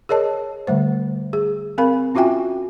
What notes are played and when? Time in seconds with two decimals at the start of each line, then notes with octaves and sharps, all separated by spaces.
0.09 G#4 A#4 C#5 D#5 A5
0.67 D3 G3 A3 C5
1.33 G#4
1.78 C4 A#4 F5 B5
2.15 C#4 F4 F#4 E5 G5 G#5